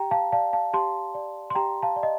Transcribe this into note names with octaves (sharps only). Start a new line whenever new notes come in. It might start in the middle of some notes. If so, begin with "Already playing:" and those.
Already playing: G4 G5 A#5
F5 A5
D5 F5 A5
F5 A5
G4 A5 C6
D5
C6
G4 G5 A#5
F5 A5
D5
D#5